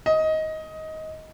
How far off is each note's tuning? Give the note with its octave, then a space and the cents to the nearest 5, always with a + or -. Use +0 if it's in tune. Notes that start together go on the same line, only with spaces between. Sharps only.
D#5 +15